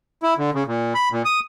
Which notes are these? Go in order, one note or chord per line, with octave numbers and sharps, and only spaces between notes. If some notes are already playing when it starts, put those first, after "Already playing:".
E4
D3
C#3
A#2
B5
A#2
D#6